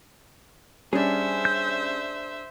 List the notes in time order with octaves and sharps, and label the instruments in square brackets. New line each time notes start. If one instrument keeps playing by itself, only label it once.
[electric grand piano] G3 C#4 [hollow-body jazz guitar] D4 G#4 [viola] C5 E5
[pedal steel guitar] G6